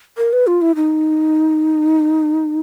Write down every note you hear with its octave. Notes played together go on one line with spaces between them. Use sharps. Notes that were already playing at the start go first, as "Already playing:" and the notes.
A#4
B4
F4
E4
D#4